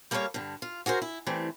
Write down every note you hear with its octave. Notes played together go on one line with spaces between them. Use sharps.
G3 A#3 A4 A#4 C#5 F5
G2 D3
F4
F#4 G#4 A#4 C5
E4
E3 G3 A3 C4